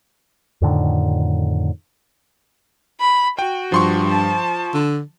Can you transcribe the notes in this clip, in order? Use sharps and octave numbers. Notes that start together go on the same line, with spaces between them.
F2 A2 D3 D#3
B5
F#4 G5
G2 F3 C6 C#6
A5
D3